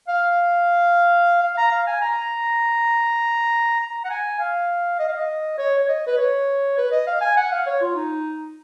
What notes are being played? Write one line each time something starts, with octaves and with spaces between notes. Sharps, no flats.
F5
F5
A#5
F5
G#5
A#5
A#5
F#5
G#5
F5
D#5
F5
D#5
C#5
C#5
D#5
B4
C#5
B4
D#5
F5
G#5
F#5
F5
C#5
F4
D#4